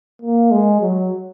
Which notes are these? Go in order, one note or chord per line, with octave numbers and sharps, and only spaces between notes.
A#3
G#3
F#3